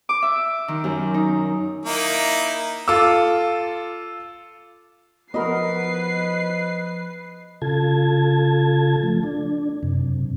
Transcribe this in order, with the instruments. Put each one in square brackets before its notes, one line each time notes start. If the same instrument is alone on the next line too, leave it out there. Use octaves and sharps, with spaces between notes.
[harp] D6
E5
D#3
F#2
D#4
[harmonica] A#3 D#4 E4
[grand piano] F4 A4 D6 E6
[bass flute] F3 [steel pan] B3 F#4 A#4 [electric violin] B4 C7 [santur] D#5 B5
[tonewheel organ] C#3 F4 A4 A5 G#6
F3 A3
D4
F#2 C3